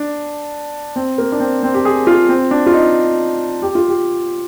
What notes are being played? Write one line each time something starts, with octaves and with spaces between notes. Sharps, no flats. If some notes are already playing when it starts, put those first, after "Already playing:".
Already playing: D4
C4
A#3
D4
C4
C4
G4
G#4
F4
C4
D4
F4
D#4
G4
F4
G4